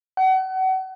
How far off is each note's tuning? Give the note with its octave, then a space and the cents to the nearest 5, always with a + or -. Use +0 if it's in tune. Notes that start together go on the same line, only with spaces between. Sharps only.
F#5 +35